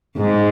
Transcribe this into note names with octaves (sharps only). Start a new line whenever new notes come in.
G#2